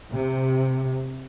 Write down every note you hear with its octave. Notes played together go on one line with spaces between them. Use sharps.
C3